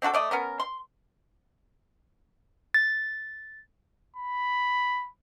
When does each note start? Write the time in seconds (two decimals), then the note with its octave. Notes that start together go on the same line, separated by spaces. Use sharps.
0.02 C4 D4 F#4 A4
0.14 A3 D5 D#5
0.31 B3 C#4 A#4
0.59 C6
2.74 A6
4.16 B5